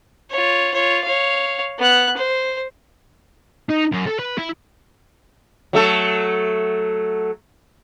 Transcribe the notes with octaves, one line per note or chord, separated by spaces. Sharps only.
F4 C#5
F4 C#5
C#5 F5
B3 F#6
C5
D#4
F#2
A4
B4
E4
F#3 A3 A4